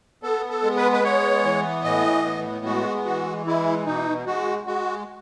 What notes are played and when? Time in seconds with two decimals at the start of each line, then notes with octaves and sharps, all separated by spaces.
0.23 B3 A4
0.50 A4
0.63 G#3
0.77 B4
0.92 B4
1.03 B3 C#5
1.44 E3
1.84 A2 D#5
2.25 B3
2.65 G#3 F#4
3.05 E3 F#4
3.46 G#3 E4
3.86 B2 D#4
4.26 G#3 F#4
4.67 G#3 F#4